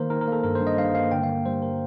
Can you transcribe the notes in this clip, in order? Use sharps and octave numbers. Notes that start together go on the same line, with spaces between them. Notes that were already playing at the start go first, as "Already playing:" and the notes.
Already playing: D#3 A#3 A#4 C5
D#3 A#4
A#4
A#3
A4
G2 A#4
C5
G2
D#5
G2 F5
A#3 F5
D3 G5
F5
A#3
G3 C5
A#4